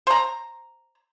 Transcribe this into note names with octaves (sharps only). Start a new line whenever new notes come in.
C5 A#5